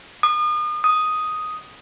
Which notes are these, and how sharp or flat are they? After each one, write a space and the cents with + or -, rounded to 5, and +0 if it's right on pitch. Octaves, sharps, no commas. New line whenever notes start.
D#6 -40
D#6 +0